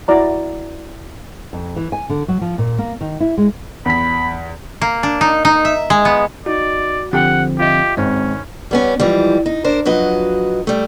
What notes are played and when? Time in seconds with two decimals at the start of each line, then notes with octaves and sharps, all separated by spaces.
0.08 E4 F#4 D5 A#5
1.53 F2
1.76 E3
1.92 G#5
2.09 D3
2.28 F#3
2.41 F3
2.58 A#2
2.78 A#3
3.01 D#3
3.20 E4
3.38 G#3
3.86 E2 B5 B6
4.81 A#3
5.03 D4
5.21 D#4
5.45 D#4
5.65 E5
5.90 G#3
6.05 B3
6.46 D#4 F#4 D5
7.13 D3 F3 C4 G4 F#5 G5
7.59 F4 G4 D#5 E5
7.97 G#1 G#3 C4 C#4
8.71 G3 B3 C#4
9.00 G#2 E3 F3 G3
9.46 D#4
9.64 D4 A#4 C5
9.85 F3 F#3 F#4 B4 D#5
10.67 G3 A3